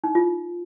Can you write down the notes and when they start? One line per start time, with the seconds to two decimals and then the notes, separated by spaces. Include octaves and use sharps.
0.04 D#4
0.15 F4